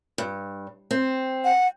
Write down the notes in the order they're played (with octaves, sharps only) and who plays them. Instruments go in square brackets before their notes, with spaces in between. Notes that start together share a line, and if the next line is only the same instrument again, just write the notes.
[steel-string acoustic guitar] G2
C4
[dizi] F#5